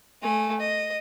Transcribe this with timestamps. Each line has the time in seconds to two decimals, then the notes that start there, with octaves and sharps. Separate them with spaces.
0.22 A3 G#5
0.60 D#5